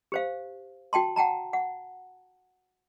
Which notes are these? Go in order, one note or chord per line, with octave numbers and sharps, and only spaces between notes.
G4 C5 F5
F#4 G5 A5 C6
F#5 G5 A5 A#5
F#5